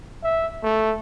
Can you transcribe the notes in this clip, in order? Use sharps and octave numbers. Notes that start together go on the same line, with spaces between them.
E5
A3